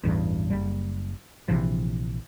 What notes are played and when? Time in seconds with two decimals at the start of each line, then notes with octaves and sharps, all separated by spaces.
0.04 A1 E2 G2
0.50 F#1 G3
1.48 A#1 C3 E3 F3